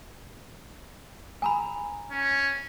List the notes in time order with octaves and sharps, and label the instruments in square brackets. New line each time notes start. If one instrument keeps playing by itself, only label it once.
[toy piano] G#5 A#5 B5
[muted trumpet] C#4